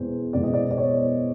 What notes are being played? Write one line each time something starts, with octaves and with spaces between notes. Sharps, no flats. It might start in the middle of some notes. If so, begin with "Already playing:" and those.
Already playing: E2 B2 G#3 C4 C5
E2 B2 G#3 C4 D5
D#5
D5
D5
C#5